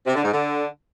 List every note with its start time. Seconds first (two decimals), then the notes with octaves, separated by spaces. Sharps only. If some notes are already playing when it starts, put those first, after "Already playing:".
0.06 C3
0.15 D3
0.24 G#2
0.33 D3